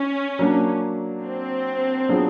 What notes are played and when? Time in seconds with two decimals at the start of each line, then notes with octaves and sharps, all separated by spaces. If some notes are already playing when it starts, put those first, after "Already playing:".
Already playing: C#4
0.39 F#3 A#3 D4
1.24 C4
2.09 F#3 B3 D4 F4 G#4